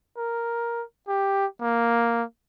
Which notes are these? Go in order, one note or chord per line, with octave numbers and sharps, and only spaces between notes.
A#4
G4
A#3